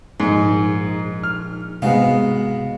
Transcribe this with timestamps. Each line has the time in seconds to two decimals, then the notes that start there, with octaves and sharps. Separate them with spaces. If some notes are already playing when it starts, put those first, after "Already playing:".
0.20 A#1 G#2 D#4
1.23 F6
1.82 G#2 C3 G#3 B3 F#4 F5